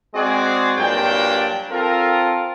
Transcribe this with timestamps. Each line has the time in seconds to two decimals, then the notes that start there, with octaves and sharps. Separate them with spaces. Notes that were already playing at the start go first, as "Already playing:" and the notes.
0.14 G#3 C4 F#4 G#4 D5
0.77 G2 A#2 F#3 D4 G5
1.71 C4 F4 A4 A#4